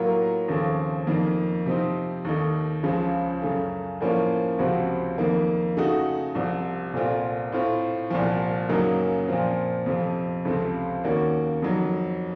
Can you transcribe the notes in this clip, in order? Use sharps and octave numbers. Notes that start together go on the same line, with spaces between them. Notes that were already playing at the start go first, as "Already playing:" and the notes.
Already playing: A2 F#3 A#3 F4 A#4
D#2 C#3 F3 A3 C4
F2 D#3 A#3
C3 F3 C4 D#4
D#2 D#3 A3 D#4
C#2 C#3 F3
F#2 C#3 A3
A2 F3 A#3 C#4 F4
C#2 C3 F3 C4 F#4
F2 D#3 A#3
C#3 A3 D#4 F#4
C2 C3 F3
C2 A#2 A3 C4 F4
A2 A3 C4 F4
C2 A#2 F3
F#2 C#3 F#3 A#3 D#4
A#2 F3 C4
F2 C3 F3
C#2 C3 F3 A3 C4
D#2 D#3 A#3 C#4 F#4
F2 D#3 F#3